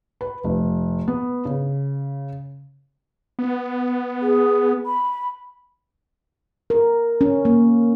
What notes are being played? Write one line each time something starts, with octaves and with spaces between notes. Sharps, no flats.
B4
F1
B3
C#3
B3
G#4
B5
A#4
C#4
A#3